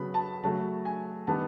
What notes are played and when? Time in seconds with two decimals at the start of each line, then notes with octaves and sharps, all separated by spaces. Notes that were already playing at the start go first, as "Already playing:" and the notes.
Already playing: C#3 F#3 B3 B5
0.14 A5
0.43 C#3 F#3 A3 A5
0.85 G#5
1.27 D#3 G3 B3 A5